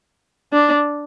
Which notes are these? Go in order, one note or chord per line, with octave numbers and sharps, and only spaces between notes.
D4